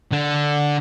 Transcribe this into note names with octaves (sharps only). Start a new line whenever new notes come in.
D3